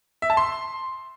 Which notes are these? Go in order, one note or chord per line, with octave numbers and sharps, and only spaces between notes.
E5
A5
C6